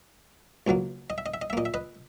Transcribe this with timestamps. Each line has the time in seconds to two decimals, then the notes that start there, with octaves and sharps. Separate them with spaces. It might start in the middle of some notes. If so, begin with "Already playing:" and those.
0.67 C#2 B2 F#3 A#3
1.10 D#5
1.18 E5
1.26 D#5
1.34 E5
1.42 D#5
1.50 E5
1.53 A#2 A#3 D#5
1.65 E5
1.74 B4 D#5